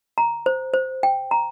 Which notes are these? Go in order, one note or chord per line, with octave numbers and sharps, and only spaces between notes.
A#5
C5
C5
G5
A#5